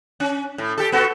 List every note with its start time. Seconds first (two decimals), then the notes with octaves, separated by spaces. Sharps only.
0.20 C#4
0.58 A2
0.78 G4 A4
0.92 B3 F#4 A4